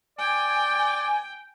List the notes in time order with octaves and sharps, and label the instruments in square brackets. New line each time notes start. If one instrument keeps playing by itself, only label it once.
[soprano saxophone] D5 [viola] G5 [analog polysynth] G#5